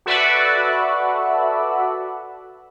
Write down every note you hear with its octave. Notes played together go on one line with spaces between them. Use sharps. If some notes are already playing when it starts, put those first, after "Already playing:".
F#4 A4 B4 D5 E5 F#5